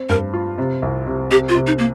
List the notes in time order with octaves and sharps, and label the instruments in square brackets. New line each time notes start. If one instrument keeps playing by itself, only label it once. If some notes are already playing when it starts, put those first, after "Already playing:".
Already playing: [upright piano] C4
[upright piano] G2 [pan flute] A#4
[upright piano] F4
C3
C2
C3
[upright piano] C3 [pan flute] G4
[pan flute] F4
[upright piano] C3
[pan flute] D#4
A#3